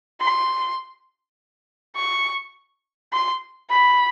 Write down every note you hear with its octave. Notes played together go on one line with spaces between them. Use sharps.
C6
C#6
C6
B5